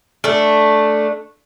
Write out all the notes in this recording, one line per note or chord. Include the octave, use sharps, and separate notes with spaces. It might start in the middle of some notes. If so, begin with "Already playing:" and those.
A3 D4